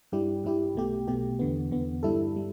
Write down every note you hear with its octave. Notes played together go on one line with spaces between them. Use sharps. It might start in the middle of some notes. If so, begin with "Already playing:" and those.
G2 G3 E4 G4
G2 G3 E4 G4
B1 B2 A3 G4
B1 B2 A3 G4
E2 D3 B3
E2 D3 B3
G2 G3 E4 A4
G3